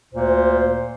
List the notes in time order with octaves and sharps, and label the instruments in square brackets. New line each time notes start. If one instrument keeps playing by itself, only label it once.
[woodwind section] D2 A#2 A#3 C5